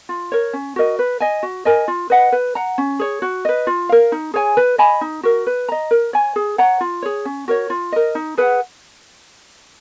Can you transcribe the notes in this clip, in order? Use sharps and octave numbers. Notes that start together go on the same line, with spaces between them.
F4
A#4 C#5
C#4
F#4 A#4 D#5
B4
D#5 G#5
F#4
A#4 D#5 G#5
F4
B4 D#5 F#5
B4
F#5 A#5
C#4
G#4 C#5
F#4
B4 D#5
F4
A#4 F5
D#4
G#4 C#5 G#5
B4
D#5 G#5 B5
D#4
F#4 A#4
B4
D#5 A#5
A#4
C#5 G#5
G#4
C#5 F#5 A#5
F4
G#4 C#5
C#4
F#4 A#4 C#5
F4
A#4 D#5
D#4
G#4 B4 F#5